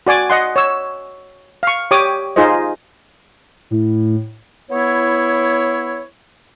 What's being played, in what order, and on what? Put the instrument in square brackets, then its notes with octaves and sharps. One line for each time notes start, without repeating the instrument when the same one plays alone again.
[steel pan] F#4 D5 G#5 D6
D#5 F#5 C6
C#5 E6
F5 C#6
G4 C#5 D6 D#6
D#4 F4 G#4 C5 D#5
[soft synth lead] A2
[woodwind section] B3 E4 C#5